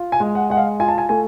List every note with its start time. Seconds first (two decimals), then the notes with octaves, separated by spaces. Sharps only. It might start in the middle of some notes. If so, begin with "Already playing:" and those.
Already playing: F4
0.12 G#5
0.20 G#3
0.35 F#5
0.50 G#3 F#5
0.57 F5
0.80 F4 G#5
0.89 A5
0.98 G#5
1.09 A3 G#5